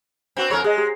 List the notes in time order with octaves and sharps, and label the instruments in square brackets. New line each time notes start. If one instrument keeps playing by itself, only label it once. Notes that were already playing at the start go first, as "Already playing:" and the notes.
[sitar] C4 F#4 [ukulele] D4 B4
[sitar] F2 A#4 C#5 [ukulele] E4 A4 B5
[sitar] G#3 [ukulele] G#4 D#5
[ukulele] G4 G#4